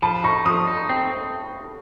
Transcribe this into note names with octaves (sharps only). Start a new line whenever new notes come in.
F3 A5 B5
D#4 B5 C#6
F3 C#6 D#6
D#4
C4